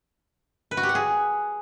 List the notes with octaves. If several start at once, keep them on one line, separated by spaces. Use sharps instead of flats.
B4
F#4
G4
F#5
G#4